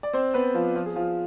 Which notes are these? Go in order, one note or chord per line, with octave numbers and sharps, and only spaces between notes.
D5
C4 C5
B3 B4
F3 F4
F3 F4
G#4
F3 F4